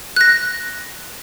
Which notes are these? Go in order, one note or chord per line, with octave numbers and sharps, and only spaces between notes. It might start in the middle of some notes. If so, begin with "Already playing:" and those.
F#6 A#6